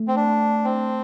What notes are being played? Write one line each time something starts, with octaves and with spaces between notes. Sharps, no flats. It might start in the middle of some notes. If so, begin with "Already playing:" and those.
Already playing: A3
C4
D4
C4